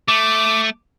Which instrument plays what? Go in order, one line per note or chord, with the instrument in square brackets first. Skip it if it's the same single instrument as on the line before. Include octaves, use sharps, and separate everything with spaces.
[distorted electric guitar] A3 [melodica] D6